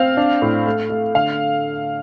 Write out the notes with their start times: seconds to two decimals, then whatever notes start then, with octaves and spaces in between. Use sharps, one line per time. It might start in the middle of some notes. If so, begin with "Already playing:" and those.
Already playing: C4 F5
0.17 D4
0.42 A2
0.66 A3
0.90 A3
1.15 D3 F5